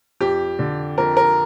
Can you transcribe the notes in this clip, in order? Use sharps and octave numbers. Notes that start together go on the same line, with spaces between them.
F2 G4
D3
F2 A#4
A#4